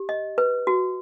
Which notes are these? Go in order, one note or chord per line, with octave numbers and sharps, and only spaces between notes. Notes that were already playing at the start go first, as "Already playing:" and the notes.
Already playing: G4
D#5
B4
F#4